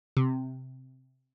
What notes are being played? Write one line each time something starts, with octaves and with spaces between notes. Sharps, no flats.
C3